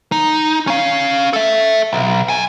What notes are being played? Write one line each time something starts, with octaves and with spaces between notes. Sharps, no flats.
D#4
C#4 F5
A4 E5
B1
F#5 G#5